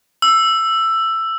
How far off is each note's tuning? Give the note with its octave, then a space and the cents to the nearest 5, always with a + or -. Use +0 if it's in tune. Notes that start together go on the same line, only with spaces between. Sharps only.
E6 +10